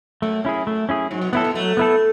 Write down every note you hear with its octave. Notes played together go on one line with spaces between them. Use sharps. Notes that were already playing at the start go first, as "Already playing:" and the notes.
F#2 A3
C#4 E4 G#4
A3
C#4 E4 G#4
G#2 F#3
B2
A2 B3 E4 A4
B2
F#3 A3
B3 E4 A4